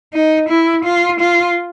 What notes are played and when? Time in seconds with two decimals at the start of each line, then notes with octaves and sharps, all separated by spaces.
0.13 D#4
0.49 E4
0.85 F4
1.20 F4